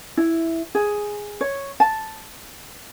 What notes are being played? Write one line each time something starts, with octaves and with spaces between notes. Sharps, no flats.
E4
G#4
C#5
A5